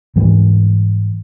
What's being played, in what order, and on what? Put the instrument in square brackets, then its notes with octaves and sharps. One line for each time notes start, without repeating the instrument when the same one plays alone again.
[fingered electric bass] G#2 E3 G3